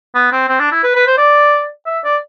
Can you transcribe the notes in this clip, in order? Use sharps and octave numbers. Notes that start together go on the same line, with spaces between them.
B3
C4
C4
D4
E4
B4
B4
C5
D5
E5
D5